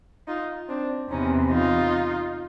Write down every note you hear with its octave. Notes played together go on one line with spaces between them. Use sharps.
D#4 F4
C4 D4
E2 C3 E3 C#4 D#4
D#4 F4